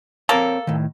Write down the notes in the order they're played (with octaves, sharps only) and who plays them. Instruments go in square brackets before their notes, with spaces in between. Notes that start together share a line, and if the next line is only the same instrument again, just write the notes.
[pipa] A#3 A4 [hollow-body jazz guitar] C4 A#4 C#5
[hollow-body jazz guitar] A2 D#3